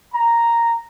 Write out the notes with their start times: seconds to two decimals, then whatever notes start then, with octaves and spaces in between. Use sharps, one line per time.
0.15 A#5